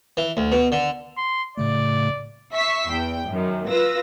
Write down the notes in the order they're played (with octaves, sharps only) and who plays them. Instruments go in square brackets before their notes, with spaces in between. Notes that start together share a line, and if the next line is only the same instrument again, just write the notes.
[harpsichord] E3
D2
B2
D3
[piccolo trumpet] C6
[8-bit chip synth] A2 C#3 A3 [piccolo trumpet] D5
[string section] E5 C#6 E6 B6 C7
E2 G5
F#2 D#3
F4 B4 E6 A#6